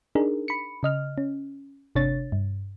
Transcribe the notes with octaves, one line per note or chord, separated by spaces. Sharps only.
D4 D#4 G#4 A#4
B5 C#7
C#3 D#5 F6
C#4
G1 C3 D4 C#5 A6
G2